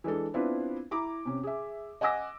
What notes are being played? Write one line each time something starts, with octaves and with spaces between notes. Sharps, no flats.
E3 G#3 D4 A4
B3 C4 D4 E4 F4 B4
E4 A#5 D6
C3 C#4
G#4 E5
D#5 F#5 G#5 D6 E6 A#6